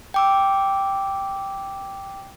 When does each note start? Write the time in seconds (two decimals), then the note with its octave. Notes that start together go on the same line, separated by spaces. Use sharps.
0.14 G5 D6 E6